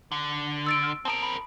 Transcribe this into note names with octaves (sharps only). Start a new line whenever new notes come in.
D3
E6 A6 D7
F6
C4 A#4 A5 D#6 D7
B5